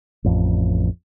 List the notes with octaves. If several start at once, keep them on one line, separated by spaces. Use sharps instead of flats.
A1 F2